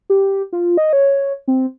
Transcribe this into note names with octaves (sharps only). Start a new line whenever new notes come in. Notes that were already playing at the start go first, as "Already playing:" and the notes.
G4
F4
D#5
C#5
C4